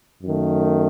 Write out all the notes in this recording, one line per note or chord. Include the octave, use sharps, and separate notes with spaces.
F#2 D#3 A3